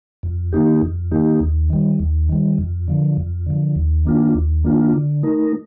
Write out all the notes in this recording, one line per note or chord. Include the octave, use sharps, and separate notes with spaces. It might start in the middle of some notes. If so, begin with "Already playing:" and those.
F2
D#3 A#3 D#4 G4
F2
D#3 A#3 D#4 G4
D#2
D#3 G3
D#2
D#3 G3
F2
D3 F3
F2
D3 F3
D#2
D#3 A#3 D4 F4
D#2
D#3 A#3 D4 F4
D3
A3 D#4 A#4